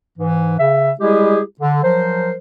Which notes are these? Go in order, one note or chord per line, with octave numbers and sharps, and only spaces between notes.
G#2 E3
C#3 E5
G3 G#3 E4 G4 G#4
D3
F3 F#3 A#4 C5